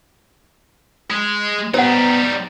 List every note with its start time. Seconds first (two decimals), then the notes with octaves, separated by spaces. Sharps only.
1.10 G#3
1.74 G3 B3 D#4 C5 F#5